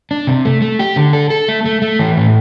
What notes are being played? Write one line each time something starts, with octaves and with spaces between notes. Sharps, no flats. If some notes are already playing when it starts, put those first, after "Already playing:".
D4
C3
A3
A3
G4
D3
A4
A4
A3
A3
A3
E3
A2